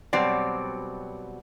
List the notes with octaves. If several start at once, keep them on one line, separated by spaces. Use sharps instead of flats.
B2 F#3 G3 C4 D5